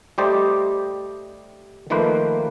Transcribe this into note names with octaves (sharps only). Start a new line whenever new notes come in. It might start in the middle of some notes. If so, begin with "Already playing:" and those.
G3 A3 G4 C5 D5 D#5
D#3 F3 A3 A#3 B4 C5